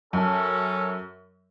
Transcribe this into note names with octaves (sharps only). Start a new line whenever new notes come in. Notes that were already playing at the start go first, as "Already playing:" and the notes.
F#2 C#4 A4